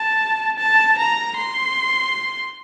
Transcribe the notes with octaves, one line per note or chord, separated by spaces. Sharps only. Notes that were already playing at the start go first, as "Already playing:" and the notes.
Already playing: A5
A5
A#5
C6